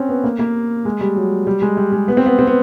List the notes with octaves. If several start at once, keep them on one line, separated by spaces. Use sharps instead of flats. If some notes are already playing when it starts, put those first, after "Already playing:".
Already playing: C4 C#4
B3
A#3
A#3
G#3
G3
F#3
G3
G#3
G3
G#3
B3
C4
B3
C4
B3